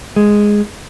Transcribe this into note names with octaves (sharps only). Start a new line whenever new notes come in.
G#3